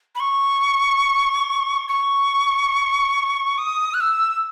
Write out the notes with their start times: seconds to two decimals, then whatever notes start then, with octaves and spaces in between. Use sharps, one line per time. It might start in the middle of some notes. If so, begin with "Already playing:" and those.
0.15 B5
0.20 C#6
1.88 C#6
3.58 D#6
3.94 F#6
4.00 E6